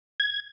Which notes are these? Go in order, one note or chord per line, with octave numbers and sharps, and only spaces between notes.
G#6